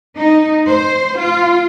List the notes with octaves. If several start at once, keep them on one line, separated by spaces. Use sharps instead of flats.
D#4
C5
F4